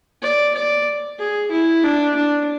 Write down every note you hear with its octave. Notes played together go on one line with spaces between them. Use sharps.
D5
D5
G#4
E4
D4
D4